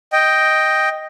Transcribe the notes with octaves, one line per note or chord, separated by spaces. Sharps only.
D#5 G5